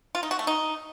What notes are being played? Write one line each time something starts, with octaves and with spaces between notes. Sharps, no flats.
F4
D#4
F#4
A3
D#4